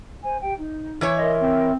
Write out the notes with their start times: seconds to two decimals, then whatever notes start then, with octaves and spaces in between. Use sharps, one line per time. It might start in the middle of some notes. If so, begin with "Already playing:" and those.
0.23 C5 G#5
0.42 G4 G5
0.57 D#4
1.01 E3 E4 C#5
1.17 A#4 D#5 E5 C6
1.42 C4